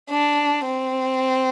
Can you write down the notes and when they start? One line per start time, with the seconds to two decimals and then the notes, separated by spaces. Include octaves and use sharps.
0.10 D4
0.65 C4